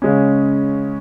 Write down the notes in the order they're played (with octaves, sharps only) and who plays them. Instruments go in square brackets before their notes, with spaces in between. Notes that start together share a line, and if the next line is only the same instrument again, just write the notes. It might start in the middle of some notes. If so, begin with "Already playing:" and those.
[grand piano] C#3 G#3 C#4